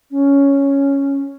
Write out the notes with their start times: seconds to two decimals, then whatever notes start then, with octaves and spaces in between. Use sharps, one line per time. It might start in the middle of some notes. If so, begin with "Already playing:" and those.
0.11 C#4